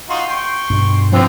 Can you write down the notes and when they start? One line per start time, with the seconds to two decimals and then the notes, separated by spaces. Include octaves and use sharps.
0.10 D#4 F4 F#4 C6
0.28 G5 C#6
0.70 G2 B2
1.12 D3 E3 F3 C4